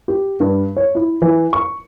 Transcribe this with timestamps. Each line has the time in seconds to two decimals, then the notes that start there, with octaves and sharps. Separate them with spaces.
0.08 G4
0.40 G2
0.76 C#5
0.95 E4
1.22 E3
1.53 C#6